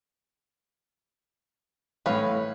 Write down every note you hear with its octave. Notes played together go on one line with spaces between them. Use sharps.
A2 E3 B4 C#5 F5